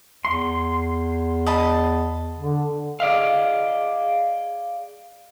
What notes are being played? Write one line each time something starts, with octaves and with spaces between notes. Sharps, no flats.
E2 C6
D#5 A5 B5
D3
G#4 D5 D#5 F5